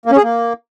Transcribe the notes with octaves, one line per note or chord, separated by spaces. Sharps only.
A#3
C#4
G#4
A#3